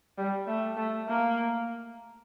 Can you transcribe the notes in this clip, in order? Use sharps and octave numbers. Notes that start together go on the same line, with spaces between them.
G3
A3
A3
A#3